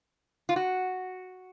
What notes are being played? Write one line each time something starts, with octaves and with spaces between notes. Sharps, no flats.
F4
F#4